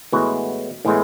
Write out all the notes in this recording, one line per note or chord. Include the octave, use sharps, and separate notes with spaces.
A2 E3 G#3 B3 F#4
A2 E3 G#3 B3